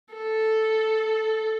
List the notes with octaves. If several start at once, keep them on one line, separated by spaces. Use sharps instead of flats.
A4